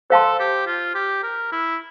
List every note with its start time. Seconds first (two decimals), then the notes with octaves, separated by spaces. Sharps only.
0.10 A4 C5 F5 A5 C6
0.40 G4
0.67 F4
0.95 G4
1.23 A#4
1.52 E4